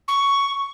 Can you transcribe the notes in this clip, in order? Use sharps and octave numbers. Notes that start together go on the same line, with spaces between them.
C#6